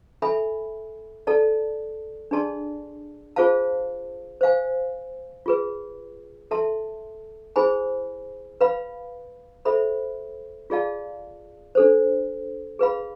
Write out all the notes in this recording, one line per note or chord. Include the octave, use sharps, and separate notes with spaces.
A4 E5 G#5 B5
A4 D5 A5
D4 G#4 D5 A5 C6
F4 G#4 C5 F5 A5
C5 F5 G#5
F4 G#4 B4
A4 E5 A5 C6
E4 G#4 C5 G#5 B5
B4 F5 B5
A4 C5 E5 B5
F4 G#4 D5 F5 A5
D4 A4 C5
G#4 B4 F5 B5